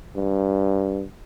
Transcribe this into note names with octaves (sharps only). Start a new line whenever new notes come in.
G2